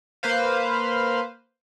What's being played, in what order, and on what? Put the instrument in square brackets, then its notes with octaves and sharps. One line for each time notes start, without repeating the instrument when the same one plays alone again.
[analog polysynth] A#3 B4 C5 F5